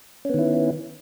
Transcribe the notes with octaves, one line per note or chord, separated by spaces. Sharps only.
D#3 B3 C#4 E4